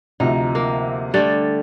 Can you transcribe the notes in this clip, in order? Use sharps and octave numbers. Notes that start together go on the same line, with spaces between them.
D2 C3 F3 D#4
A#3
D3 G3 A3